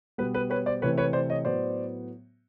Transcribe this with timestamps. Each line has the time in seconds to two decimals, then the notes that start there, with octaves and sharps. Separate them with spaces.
0.18 B2 G3 B3 B4
0.34 B4
0.50 B4 C#5
0.66 C5 D5
0.82 C3 E3 A3 B4 C#5
0.98 B4 C#5
1.13 C5 D5
1.30 C#5 D#5
1.45 A2 F#3 B3 C5 D5